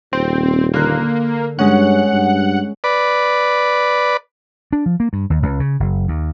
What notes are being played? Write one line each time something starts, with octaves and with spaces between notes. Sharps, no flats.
D#1 C4
D3 A#3 A#4 F#6
G2 G#3 C#4 F#5
G2
B4 D5
D4
F3
A#3
G2
D#2
C#2
C#3
F#1
D#2